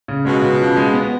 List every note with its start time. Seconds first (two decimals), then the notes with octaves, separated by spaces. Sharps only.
0.08 C#3
0.25 B2 G#3
0.42 C#3
0.60 F3
0.76 G#3
0.93 B3